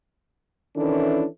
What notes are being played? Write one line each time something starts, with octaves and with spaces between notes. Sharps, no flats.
D#3 E3 C#4 D4 E4 A4